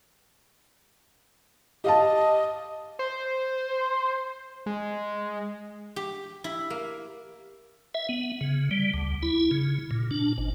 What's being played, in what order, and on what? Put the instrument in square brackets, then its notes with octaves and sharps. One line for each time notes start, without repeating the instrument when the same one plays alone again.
[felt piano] G4 F5 A5 [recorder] D#5
[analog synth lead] C5
G#3
[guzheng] G4
E4
A#3
[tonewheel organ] E5
B3
C#3
G3
D2
E4
C#3
A#2
D4
G#1